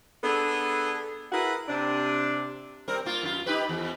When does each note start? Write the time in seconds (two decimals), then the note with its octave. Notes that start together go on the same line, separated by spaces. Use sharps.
0.23 B3 D4 G#4 A4
1.32 E4 G#4 A#4 B4 F#5
1.68 C3 D4
2.88 G3 C4 A#4
3.06 A#3 F4
3.23 F#2 F4
3.46 D#4 G4 B4
3.69 E2